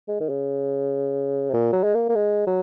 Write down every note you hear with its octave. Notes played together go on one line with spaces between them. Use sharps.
G#3
D#3
C#3
C3
A#2
F#3
G#3
A#3
A#3
G#3
F#3